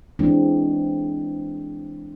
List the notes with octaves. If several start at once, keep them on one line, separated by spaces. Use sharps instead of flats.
E3 G#3 C4 D4